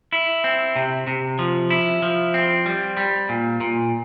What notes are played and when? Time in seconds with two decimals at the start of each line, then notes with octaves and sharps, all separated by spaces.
0.13 E4
0.44 C4
0.76 C3
1.07 C3
1.39 F3
1.70 E4
2.02 F3
2.34 C4
2.66 G3
2.97 G3
3.29 A#2
3.61 A#2